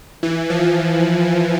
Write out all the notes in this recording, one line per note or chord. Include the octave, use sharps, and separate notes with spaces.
E3
F3